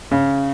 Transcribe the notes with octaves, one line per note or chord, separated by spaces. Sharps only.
C#3